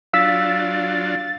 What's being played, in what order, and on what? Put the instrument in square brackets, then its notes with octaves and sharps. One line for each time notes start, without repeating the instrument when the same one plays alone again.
[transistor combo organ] F#3 D4 F4 [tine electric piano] F5 E6 B6 [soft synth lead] A6